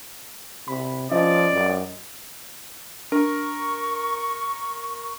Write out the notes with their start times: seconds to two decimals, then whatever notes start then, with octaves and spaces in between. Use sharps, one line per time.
0.68 C3 B5
1.11 F3 C#4 D5 D#5
1.53 F#2
3.12 D4 A#4 C#6